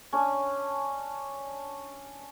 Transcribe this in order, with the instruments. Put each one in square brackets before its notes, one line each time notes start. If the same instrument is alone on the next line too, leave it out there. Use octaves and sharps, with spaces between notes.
[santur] C#4 D4 G#5